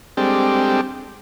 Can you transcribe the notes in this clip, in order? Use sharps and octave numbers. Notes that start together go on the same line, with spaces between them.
G3 G#3 C4 D4 G4 A4